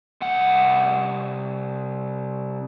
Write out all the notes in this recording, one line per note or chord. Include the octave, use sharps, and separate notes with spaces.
C2 F#5